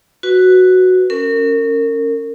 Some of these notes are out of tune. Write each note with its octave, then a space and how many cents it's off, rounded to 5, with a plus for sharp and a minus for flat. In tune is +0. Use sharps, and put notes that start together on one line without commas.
F#4 +0 B4 +0
C#4 +0 A#4 -30